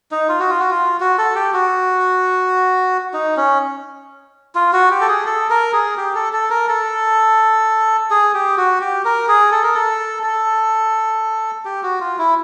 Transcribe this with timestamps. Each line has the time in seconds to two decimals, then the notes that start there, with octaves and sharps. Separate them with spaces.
0.11 D#4
0.29 F4
0.40 F#4
0.50 F4
0.60 F#4
0.71 F4
1.00 F#4
1.18 A4
1.35 G4
1.53 F#4
3.13 D#4
3.37 C#4
4.55 F4
4.73 F#4
4.91 G4
5.01 A4
5.08 G#4
5.26 A4
5.50 A#4
5.73 G#4
5.97 G4
6.15 A4
6.33 A4
6.50 A#4
6.69 A4
8.11 G#4
8.34 G4
8.57 F#4
8.81 G4
9.05 A#4
9.28 G#4
9.52 A4
9.63 A#4
9.74 A4
10.23 A4
11.65 G4
11.83 F#4
12.00 F4
12.18 E4